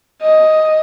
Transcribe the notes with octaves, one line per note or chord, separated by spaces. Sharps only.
D#5